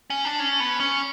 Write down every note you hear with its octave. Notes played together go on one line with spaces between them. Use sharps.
C#4
D4
C#4
B3
C#4